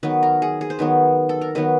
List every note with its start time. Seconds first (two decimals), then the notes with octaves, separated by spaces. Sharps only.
0.03 D#3 F#3 B3 B4
0.23 A#4
0.42 G#4
0.61 G#4
0.70 C5
0.79 D#3 F#3 B3 B4
1.29 A4
1.41 A#4
1.55 D#3 F#3 B3 B4